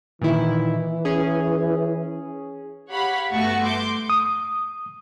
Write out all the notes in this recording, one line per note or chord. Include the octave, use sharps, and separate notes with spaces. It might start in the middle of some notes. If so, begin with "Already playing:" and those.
A#2 D#3 E3 E4
C#4 G#4
G4 C#5 F5 F#5 B5
G1 A3 B3 F#4 A5 C#6
C6 D6 G6
D#6